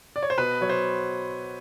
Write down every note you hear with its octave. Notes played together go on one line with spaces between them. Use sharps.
D5
C#5
C5
B2 B4
F#3 C#5
C5